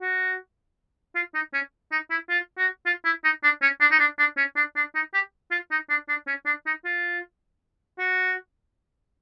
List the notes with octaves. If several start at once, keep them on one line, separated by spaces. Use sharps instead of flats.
F#4
F4
D#4
C#4
D#4
E4
F4
F#4
F4
E4
D#4
D4
C#4
D4
D#4
D4
D4
C#4
D4
D4
D#4
G4
F4
D#4
D4
D4
C#4
D4
D#4
F4
F#4